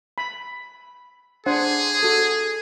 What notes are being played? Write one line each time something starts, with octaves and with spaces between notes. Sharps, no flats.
B5
D4 G#4 C5 F#5
F#4 A4